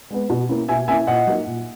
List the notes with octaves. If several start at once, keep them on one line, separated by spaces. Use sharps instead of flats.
G#3 B3
B2
A#3 C#4 E4
B2 E5 G#5
A#3 C#4 E4 E5 G#5
A#2 D#5 F#5
F#3 A#3 D#4
A#2